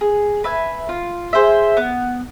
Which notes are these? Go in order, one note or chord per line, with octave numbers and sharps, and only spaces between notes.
G#4
B4 E5 G#5
F4
G#4 C5 E5
B3